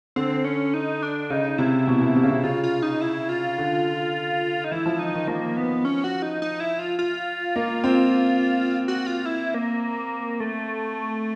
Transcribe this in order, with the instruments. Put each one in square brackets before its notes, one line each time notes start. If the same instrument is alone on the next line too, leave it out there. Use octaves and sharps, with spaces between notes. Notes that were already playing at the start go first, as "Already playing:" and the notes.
[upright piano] D3 [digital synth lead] C4
[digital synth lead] C#4
D#4
D4
[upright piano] C#3 [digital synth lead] D#4
[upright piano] C3 [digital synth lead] E4
[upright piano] B2
B2
C3
C#3
C3
[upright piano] C#3 [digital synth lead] F4
[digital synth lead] F4
D#4
E4
F4
[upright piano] D3
[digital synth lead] D#4
[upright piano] E3 [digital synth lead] E4
[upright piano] F3
[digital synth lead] D#4
[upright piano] D#3
[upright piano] F3 [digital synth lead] A#3
[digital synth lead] B3
C#4
F#4
D#4
D#4
E4
F4
F4
[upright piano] A#3
C4
[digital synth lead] F#4
F4
E4
A#3
A3